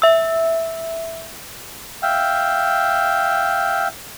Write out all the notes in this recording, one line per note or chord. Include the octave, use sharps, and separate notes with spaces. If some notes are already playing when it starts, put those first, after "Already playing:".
E5 E6
E5 F5 G5